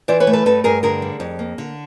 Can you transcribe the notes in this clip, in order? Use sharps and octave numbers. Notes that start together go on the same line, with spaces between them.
E3 C5 D5
B4 C#5
A3
A4 B4
G2 A4 B4
G2 G#4 A#4
D3 G#4 A#4
G3
F2
A#3
D3